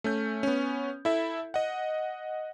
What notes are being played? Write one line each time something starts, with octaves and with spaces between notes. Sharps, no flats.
A3 C#4 G6
B3 C#4
E4 A4 E5
D#5 F#5